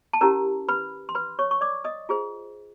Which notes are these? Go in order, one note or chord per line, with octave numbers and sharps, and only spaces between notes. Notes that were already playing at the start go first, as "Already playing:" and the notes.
A5
C#4 E4 G4 A#4 A#5
B4 B5
C6
B4 B5
C#5 C#6
C#6
D5 D6
D#5 D#6
F4 G#4 C5